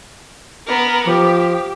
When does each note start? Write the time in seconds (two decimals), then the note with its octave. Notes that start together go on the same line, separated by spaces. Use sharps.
0.67 B3 A#4
1.07 F3 G4